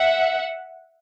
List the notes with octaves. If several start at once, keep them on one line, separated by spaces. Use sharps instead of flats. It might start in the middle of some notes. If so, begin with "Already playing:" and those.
Already playing: E5 F#5